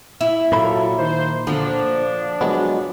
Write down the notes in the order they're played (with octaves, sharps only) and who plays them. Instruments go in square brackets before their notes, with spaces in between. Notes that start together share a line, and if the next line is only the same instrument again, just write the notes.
[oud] E4
[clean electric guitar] A#2 A#3 B5 [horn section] F#3 F4 A4
[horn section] D#3 C5
[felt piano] D3 [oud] F3 [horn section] D4
[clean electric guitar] F#3 G#3 B3